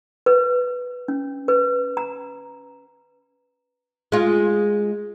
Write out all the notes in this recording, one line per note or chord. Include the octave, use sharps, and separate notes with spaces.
B4
C#4
B4
A#5
G#3 F4